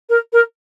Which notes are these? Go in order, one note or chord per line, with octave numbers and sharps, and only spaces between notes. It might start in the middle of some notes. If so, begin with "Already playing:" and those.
A#4
A#4